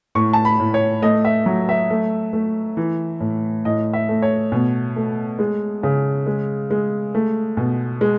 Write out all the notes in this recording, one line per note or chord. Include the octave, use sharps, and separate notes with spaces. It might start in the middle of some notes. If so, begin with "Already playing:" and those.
A2 C#6
A5
B5
A2
C#5
A3 D#5
E5
F#3
E5
A3
A3
E3
A2
A2 D#5
E5
A3
C#5
B2
A3
G#3
C#3
G#3
G#3
A3
B2
G#3